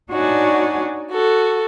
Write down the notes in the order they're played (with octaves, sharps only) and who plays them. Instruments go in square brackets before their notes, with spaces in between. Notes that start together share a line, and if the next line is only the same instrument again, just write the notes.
[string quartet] D4 D#4 F#4 C#5 D5 G#5
F#4 A4